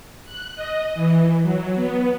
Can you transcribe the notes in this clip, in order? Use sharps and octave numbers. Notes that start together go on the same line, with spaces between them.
F#6
D#5
E3
F#3
B3